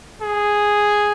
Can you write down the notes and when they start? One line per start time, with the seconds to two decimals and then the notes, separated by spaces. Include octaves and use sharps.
0.22 G#4